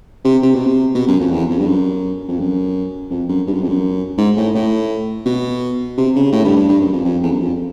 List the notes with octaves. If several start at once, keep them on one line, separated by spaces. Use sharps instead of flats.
C3
C3
B2
C3
B2
F#2
F2
E2
F2
G2
F#2
F2
F#2
F2
F#2
G2
F#2
F2
F#2
G#2
A2
A2
B2
C3
C#3
A2
G2
G2
G2
F#2
F2
F2
E2
F#2
F2